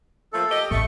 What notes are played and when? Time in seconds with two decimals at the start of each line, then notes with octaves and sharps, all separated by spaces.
0.33 F3 A3 A#3 A4
0.50 G4 D#5
0.71 A1 A3 C#6